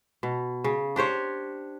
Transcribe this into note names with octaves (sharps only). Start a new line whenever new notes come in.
B2
C#3
D4 G4 C5 C#5